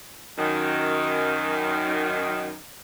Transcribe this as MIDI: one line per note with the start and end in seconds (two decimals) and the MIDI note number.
0.38 2.54 42
0.38 2.54 51